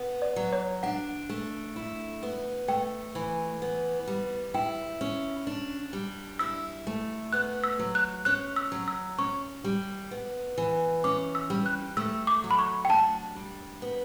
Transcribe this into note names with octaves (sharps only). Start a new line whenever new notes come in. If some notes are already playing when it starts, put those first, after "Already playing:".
Already playing: B3
D5
F#3
C#5
D4 F#5
A3
E4
B3
A3 G5
E3
B3
G3
E4 G5
C#4
D4
G3
E4 E6
A3
B3 F#6
E6
F#3
F#6
C#4 F#6
E6
F#3
E6
C#4 C#6
G3
B3
E3
C#4 D6
E6
G3
F#6
A3 E6
D6
F#3
B5
C#6
G5
D4 A5
G3
B3